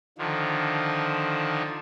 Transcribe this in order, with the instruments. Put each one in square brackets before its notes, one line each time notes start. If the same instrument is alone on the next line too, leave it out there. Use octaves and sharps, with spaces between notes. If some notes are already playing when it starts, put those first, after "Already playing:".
[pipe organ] D3 D#3 F3